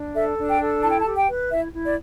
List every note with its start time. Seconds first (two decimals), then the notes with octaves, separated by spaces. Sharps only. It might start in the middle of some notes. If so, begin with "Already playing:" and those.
Already playing: D4
0.14 A4 E5
0.37 D4
0.48 G5
0.59 A4
0.82 E4 A5
0.91 G5
1.00 A5
1.05 G4
1.16 G5
1.28 B4
1.50 E4 E5
1.73 E4
1.85 D5